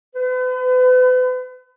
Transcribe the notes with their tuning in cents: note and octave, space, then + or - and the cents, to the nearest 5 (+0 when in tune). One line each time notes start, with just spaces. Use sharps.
B4 +40